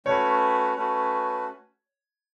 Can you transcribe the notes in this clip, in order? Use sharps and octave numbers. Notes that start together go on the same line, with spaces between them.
A3 C#4 F#4 B4 C#5
A3 C#4 F#4 B4